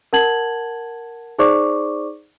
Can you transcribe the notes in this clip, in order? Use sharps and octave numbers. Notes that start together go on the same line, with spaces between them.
A#4 F#5 A5 G#6 F#7
D#4 G#4 C5 D5 C#6 D6